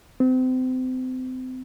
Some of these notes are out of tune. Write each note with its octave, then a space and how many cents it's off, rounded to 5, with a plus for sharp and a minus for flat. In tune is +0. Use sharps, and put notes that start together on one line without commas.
C4 -35